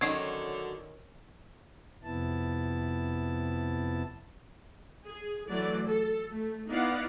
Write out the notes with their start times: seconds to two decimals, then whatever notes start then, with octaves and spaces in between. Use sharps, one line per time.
0.01 D3 D#3 F#3 C#4 G#6 C7
2.04 F2 C3 B3 E4 A5
5.05 G#4
5.50 E3 F#3 A3 D5
5.86 A4
6.30 A3
6.67 B3 D#4 E4 D5 F5 F#5